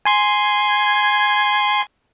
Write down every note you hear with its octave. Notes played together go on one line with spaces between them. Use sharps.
G#5 C6 G#6